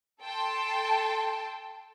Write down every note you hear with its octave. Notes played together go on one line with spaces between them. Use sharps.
A4 G5 A5 C6